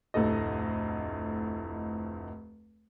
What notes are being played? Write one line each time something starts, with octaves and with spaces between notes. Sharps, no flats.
F1 D2 A2 A4 D#5